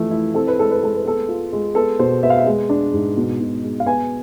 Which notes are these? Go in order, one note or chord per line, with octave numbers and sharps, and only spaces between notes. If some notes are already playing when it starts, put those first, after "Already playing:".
Already playing: E3 F3 A3
E4
C4 A4
B4
G#3 A4
B4
G#3 A4
B4
B3 A4
F4
G#3
B3 A4
B2 C5
B3 E5
F5
E5
G#3
D4
G#2
B2
B2
G#3
F5
B3 G#5